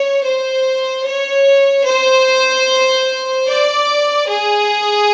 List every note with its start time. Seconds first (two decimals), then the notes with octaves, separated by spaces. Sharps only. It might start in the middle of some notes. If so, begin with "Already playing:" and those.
Already playing: C#5
0.25 C5
1.06 C#5
1.86 C5
3.48 D5
4.28 G#4